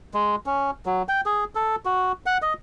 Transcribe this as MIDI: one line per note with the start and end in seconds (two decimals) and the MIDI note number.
0.14 0.36 56
0.46 0.71 61
0.86 1.03 54
1.09 1.21 79
1.26 1.44 68
1.55 1.76 69
1.85 2.12 66
2.26 2.38 78
2.42 2.53 75